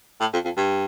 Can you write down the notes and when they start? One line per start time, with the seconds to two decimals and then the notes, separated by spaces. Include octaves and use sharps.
0.21 A2
0.33 F2
0.45 F2
0.57 G2